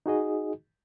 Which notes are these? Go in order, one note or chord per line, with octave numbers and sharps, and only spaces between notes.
D#4 F#4 G#4 D#5